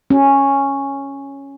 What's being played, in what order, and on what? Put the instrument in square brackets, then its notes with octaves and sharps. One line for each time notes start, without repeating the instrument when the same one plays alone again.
[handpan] C#4